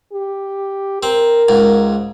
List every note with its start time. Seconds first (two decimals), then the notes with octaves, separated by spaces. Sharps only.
0.12 G4
1.03 C4 A#4
1.48 C#2 G#2